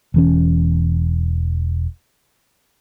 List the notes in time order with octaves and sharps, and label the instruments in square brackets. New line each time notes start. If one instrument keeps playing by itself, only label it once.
[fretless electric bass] E1 E3 C#4